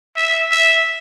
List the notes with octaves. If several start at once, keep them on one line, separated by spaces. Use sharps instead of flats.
E5
E5